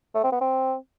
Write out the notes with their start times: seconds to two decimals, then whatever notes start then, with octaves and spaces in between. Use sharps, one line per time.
0.15 A3
0.24 C4
0.32 B3
0.41 C4